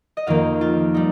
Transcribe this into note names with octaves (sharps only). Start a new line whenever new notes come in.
D#5
F2 D#3 A#3 F5
F4
G3 D#4